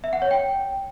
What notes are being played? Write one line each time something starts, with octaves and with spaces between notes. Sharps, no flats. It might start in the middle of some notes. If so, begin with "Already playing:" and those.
E5
F#5
C#5
G5